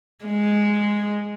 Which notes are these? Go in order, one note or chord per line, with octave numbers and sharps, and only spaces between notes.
G#3